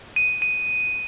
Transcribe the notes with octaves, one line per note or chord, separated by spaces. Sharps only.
D#7
D#7